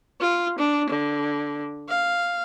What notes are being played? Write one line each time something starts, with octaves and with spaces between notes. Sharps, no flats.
F4
D4
D3
F5